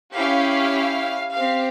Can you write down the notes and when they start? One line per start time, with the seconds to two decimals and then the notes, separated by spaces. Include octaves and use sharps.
0.15 C#4 E4 G4 F5
1.33 C4 G4 F5